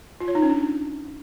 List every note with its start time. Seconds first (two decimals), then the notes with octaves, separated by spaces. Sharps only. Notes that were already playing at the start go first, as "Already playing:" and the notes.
0.20 F4
0.28 C#5
0.35 D#4
0.42 C#4
0.50 D4